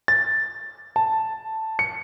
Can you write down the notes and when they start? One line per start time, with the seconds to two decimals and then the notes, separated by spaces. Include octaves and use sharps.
0.08 A6
0.96 A5
1.79 C#7